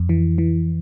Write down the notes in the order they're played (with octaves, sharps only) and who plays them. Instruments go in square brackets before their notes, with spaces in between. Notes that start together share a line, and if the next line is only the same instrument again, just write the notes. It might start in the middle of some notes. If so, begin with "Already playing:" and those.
Already playing: [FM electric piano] F2
E3
E3